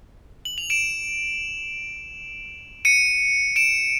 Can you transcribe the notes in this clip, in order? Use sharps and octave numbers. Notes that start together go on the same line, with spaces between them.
F#7
F7
D7 E7
C#7 D#7
D7 E7